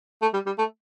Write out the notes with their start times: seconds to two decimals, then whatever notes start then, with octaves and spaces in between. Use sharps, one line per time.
0.22 A3
0.33 G3
0.46 G3
0.58 A3